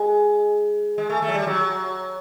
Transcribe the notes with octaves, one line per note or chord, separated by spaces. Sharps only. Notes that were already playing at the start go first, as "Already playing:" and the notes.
Already playing: G#3
G#3
A3
A3
F#3
G3
F#3